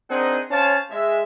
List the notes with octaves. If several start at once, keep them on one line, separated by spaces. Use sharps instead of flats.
C4 D4 D#4 G#4 A#4 F#5
C#4 C5 C#5 F5 A5
G#3 E5